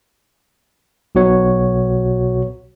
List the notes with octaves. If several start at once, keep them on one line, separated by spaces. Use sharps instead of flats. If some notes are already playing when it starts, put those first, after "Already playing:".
B1 B2 F#4 C#5